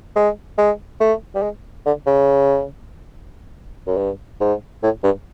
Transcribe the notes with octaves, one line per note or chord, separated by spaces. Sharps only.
G#3
G#3
A3
G3
G#3
D3
C#3
F#2
G2
G#2
A2
G2